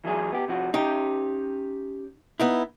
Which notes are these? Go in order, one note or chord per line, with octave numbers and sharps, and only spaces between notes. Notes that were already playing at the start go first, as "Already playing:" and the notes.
E3 F#3 G#4
B3 G4
C3 F3 F#4
C#4 D#4 G4 G5
B3 D#4 E4